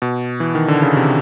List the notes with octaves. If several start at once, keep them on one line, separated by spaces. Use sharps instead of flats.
B2
E3
D#3
D3
C#3
C3